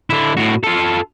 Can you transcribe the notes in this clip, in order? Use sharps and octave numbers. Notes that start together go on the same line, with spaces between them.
D3 E4
A2 F#4
F4 A4